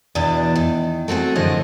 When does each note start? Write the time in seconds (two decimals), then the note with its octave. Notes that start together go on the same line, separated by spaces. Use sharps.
0.15 E2 B2 E3 D4
0.56 D#3
1.08 A3 C4 F#4 G#4
1.35 F#2 A2 D3 F3 C#5 D#5